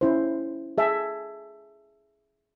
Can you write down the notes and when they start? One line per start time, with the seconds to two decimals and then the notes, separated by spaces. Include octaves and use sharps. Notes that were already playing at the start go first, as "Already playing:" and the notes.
0.01 C#4 E4 C5
0.78 G#4 E5 A5